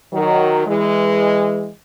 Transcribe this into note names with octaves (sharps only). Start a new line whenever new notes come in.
D#3 F#3
E3 G#3